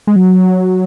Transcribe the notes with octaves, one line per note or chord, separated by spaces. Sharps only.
G#3
F#3